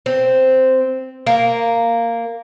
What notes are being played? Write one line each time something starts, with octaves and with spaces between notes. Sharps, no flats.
C4
A#3